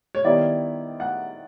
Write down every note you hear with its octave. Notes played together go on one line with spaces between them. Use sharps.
C#5
D#3 G3 B3 E4 D5
F#5